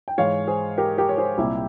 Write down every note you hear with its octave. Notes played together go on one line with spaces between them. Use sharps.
G5
G#2 E3 G#3 C#5 F5
G#4 C5
G4 A#4
G4 A#4
C#5
G#4 C5
C2 A#2 G3 E4 G4